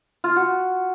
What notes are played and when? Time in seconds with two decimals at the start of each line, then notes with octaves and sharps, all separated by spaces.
0.24 F4
0.36 F#4